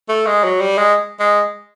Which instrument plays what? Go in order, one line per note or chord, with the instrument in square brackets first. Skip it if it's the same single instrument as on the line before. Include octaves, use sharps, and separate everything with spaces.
[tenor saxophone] A3
G#3
F#3
G3
G#3
G#3